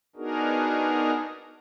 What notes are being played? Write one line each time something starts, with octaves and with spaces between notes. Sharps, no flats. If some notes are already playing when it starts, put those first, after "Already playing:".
B3 D4 D#4 F#4 G#4 A#4